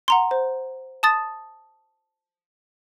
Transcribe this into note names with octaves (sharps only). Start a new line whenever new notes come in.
F#5 A#5 C6
C5
A5 D#6 A6